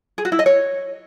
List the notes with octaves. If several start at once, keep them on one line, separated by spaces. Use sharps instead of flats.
G#4
F#4
E4
D#5
C#5